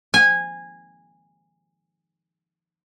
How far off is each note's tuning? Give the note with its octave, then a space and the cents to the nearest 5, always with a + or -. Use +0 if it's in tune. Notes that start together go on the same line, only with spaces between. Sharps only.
G#5 -15